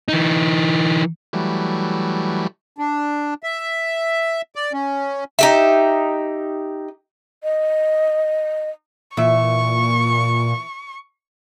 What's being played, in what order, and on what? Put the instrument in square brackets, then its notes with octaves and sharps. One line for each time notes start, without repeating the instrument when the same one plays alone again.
[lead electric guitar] E3 D#4
[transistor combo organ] E3 F#3 G3 A3
[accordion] D4
E5
D5
C#4
[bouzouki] D#4 G4 E5
[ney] D#5
[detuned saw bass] A#2 [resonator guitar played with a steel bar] E3 E5 [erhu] C#6